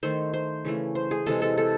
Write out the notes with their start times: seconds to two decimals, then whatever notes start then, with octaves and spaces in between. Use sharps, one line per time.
0.03 D#3 A3 C5
0.33 C5
0.65 C#3 E3 A3
0.95 C5
1.11 G#4
1.26 C3 E3 G#3 A4
1.42 A4
1.58 A4